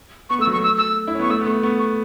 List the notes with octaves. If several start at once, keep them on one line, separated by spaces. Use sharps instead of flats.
B3 C#6
A3 E6
F#3
C#6
A3
E6
E6
E4
C#4
B3 C#6
A3 E6
B3
A3 C#6
B3 C#6
C#6